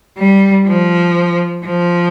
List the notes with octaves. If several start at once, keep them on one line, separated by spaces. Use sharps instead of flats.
G3
F3
F3